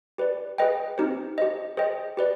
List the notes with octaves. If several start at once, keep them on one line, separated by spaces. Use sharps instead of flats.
G4 B4 D5
G#4 B4 D#5 G5
C4 D#4 G4 C5
G4 C5 D#5
G#4 C5 D#5 G5
G4 B4 D5